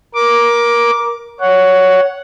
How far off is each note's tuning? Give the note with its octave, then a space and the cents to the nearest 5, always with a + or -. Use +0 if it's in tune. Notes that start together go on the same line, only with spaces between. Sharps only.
A#4 +20 D6 +0
C#5 +10 F#5 +0